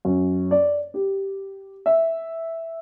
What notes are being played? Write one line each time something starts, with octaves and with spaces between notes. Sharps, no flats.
F#2
D5
G4
E5